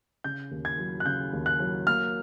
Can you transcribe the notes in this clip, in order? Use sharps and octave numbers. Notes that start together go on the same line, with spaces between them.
C#3 G6
D#2
G#6
F#3
F#6
C#3 G6
D#2
F#6
F#3
A#3 F6